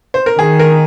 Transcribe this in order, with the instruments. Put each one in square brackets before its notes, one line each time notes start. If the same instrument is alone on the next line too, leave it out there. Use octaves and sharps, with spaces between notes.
[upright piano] C5
A#4
[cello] D#3 [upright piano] G#4
[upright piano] A#4